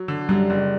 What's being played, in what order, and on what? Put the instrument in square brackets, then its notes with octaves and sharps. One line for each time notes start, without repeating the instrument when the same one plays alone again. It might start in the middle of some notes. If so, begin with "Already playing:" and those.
Already playing: [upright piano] F#3
D3
[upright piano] F#2 [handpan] G3
[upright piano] F#1